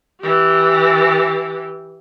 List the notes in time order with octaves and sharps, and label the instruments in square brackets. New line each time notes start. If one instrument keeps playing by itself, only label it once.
[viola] E3 G4